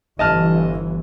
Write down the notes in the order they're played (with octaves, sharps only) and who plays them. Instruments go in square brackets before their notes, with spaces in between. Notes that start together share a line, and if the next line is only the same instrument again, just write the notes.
[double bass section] G1 E3 [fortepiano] D#5 A5 F6